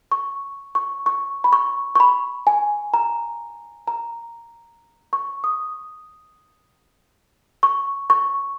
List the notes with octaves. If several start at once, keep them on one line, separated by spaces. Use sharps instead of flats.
C#6
C#6
C#6
B5
C#6
C#6
B5
G#5
A#5
A#5
C#6
D#6
C#6
C#6